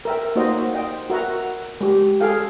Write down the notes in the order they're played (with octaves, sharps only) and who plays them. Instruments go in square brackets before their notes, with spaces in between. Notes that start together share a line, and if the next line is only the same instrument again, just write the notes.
[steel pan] A#4 E5 G5
A#3 D#4 F#4 C5 D#5
C5 D#5 G5
F#4 A#4 E5 F#5 A#5
G#3 G4
G#4 A4 F5 G5